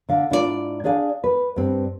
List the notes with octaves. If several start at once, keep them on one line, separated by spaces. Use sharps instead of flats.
D3 F5
G#2 D4 E4 F4 G#4 D5
D4 G#4 D5 F5 G#5
B4
G2 C4